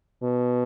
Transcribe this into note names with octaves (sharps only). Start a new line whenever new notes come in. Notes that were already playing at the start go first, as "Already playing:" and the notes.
B2